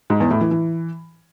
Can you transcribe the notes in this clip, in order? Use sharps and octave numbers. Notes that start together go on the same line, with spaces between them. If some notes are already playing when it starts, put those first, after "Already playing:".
G#2
E2
A2
E3
E3